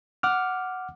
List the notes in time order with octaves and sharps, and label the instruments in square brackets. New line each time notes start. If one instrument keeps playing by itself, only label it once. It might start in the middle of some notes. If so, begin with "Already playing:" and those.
[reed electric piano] F#5 D6 F6